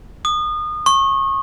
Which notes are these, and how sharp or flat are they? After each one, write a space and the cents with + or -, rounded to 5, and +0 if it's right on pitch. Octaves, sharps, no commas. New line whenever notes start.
D#6 -30
C#6 -30